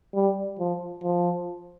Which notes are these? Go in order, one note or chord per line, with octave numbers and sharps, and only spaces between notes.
G3
F3
F3